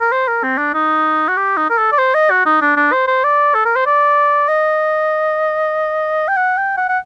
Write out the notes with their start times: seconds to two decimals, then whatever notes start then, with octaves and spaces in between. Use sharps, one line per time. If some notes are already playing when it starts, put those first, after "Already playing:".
0.01 A#4
0.12 C5
0.28 A#4
0.43 C4
0.58 D4
0.74 D#4
1.28 F#4
1.37 G4
1.57 D#4
1.70 A#4
1.78 A4
1.92 D5
1.98 C5
2.14 D#5
2.31 F#4
2.46 D#4
2.62 D4
2.77 D4
2.92 C5
3.08 C5
3.24 D5
3.54 A4
3.66 A#4
3.76 C5
3.86 D5
4.48 D#5
6.28 G5
6.36 F#5
6.57 G5
6.77 F#5
6.89 F#5